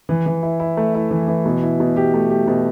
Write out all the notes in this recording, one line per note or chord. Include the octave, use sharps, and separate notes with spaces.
E3
E3
E4
E4
A3
E4
E3
E3
B2
E4
B2
G4
A3
G4
B2